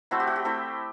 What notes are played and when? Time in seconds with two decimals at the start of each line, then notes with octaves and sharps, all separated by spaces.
0.11 A3 C4 E4 F#4
0.20 G4
0.27 F#4
0.36 G4
0.45 A3 C4 E4